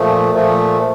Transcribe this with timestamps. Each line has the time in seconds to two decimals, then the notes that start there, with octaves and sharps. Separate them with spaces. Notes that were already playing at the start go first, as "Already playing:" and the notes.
Already playing: A#2 F3 A3
0.33 A#2 F3 A3